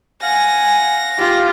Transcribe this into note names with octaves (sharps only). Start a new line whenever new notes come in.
F5 F#5 G#5 A#6
F4 G4